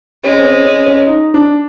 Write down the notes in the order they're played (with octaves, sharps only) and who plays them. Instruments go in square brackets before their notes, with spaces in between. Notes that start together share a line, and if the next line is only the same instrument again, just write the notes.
[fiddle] G#3 [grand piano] C#4
[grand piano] C4
C#4
C#4
C#4
D#4
D4